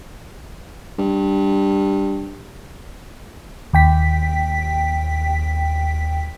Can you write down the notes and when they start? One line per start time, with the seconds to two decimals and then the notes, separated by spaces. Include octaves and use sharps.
0.98 G2
3.73 D#2 G5 B6